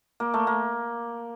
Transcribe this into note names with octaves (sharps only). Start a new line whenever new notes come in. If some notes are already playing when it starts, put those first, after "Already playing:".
A#3
A3
A#3